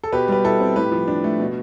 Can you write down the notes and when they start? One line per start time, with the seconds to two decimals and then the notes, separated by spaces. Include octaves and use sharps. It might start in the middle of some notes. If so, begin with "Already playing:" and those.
0.04 A4
0.12 B2 G4 B4
0.28 G3 B4
0.44 E4 A4
0.60 C4
0.76 A2 G4 B4
0.92 F3
1.08 D4
1.24 A3
1.40 B2